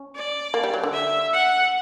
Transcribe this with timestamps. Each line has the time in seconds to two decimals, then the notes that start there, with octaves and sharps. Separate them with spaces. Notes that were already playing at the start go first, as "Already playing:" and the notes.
Already playing: C#4
0.15 D5
0.54 A#3
0.64 G3
0.74 F#3
0.84 D3
0.93 E5
1.33 F#5